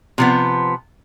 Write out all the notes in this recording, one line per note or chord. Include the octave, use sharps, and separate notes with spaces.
C3 F3 B3